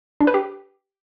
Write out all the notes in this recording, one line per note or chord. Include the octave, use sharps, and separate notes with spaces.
D4
B4
G4